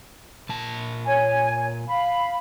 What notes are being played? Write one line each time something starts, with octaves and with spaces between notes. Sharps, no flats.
A#2 A5
C#5 G#5
F5 B5